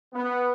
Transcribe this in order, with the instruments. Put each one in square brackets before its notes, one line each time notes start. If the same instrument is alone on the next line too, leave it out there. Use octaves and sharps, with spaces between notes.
[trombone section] B3